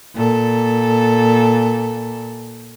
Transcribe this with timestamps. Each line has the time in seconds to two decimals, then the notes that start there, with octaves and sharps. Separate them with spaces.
0.15 A#2 A4